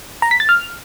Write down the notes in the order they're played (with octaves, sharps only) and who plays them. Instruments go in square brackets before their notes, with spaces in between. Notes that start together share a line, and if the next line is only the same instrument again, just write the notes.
[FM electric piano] A#5
B6
A6
F6